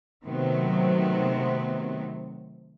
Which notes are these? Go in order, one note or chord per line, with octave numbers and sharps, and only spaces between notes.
C3 D#3 F#3 A3 B3 C4